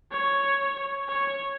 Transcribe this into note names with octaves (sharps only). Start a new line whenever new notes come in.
C#5
C#5